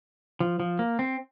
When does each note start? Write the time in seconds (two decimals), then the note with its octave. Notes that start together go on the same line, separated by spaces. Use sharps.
0.40 F3
0.60 F3
0.79 A#3
0.99 C4